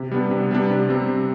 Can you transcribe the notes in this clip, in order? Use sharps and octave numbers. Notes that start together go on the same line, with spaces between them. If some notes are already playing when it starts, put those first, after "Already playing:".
Already playing: C3
G3 B3 D4
C3
G3 B3 D4
C3
G3 C4
C3